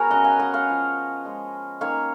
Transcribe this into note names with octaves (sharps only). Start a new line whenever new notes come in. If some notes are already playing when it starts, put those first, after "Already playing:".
Already playing: B3 F#4 G#4 A#4 C#5
C#3 F#3 C#4 D#5 F#5
F5 G#5
D#5 F#5
C#5 F5
F3 B3
F3 G#3 C#4
D#3 A#3 C#4 C#5 F5